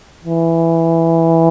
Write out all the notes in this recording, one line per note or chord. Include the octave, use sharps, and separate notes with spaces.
E3